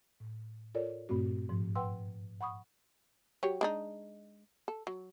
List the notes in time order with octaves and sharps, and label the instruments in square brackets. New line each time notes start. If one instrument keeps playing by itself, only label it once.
[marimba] A2
F4 A4 A#4 C#5 D5
G2 A#2 A3 C4 F#4
G#2 F3
B4 F#5 G5 C6 E6
F#5 B5 C#6 D#6
[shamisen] F#3 G4 C#5
G#3 D4 D#4
A4
F#3